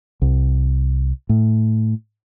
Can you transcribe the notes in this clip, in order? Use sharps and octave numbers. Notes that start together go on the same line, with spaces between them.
C2
A2